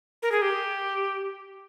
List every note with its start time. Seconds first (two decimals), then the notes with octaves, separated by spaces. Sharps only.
0.22 A#4
0.32 G#4
0.42 G4